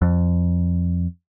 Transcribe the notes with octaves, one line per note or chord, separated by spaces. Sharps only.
F2